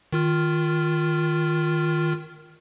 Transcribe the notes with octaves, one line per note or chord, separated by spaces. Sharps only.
D#3 F4 F6